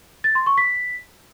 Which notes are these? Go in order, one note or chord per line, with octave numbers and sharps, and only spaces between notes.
A6
C6
C#6
B6